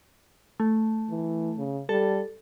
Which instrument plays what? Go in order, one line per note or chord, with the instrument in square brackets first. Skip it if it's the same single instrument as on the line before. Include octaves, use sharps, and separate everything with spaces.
[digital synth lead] A3
[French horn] E3
C#3
[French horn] G3 [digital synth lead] A4